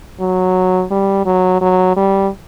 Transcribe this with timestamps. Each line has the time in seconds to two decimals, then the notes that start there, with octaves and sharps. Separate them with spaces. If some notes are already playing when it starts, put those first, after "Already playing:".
0.20 F#3
0.91 G3
1.26 F#3
1.61 F#3
1.96 G3